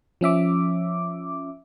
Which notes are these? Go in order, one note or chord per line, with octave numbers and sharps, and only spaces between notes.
F3 C#4 E5 D6